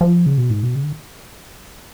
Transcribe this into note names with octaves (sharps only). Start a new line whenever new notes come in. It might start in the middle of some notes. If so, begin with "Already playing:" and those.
F3
C#3
B2
G#2
B2
C#3
D3